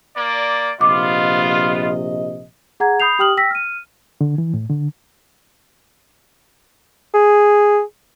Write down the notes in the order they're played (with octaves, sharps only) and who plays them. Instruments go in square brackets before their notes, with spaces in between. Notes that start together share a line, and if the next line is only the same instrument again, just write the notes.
[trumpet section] A#3 D5
[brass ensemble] A#1 C3 D#5 [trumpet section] B3 F4 [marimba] D6
[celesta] G#4 F#5 A#5 G#6
B5 D#6 G6 C7 F7
G4 G5 D#6 F6 F#7
G5 E6 A#6 B6
F6 D#7
[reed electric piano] D3
E3
A2
D3
[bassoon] G#4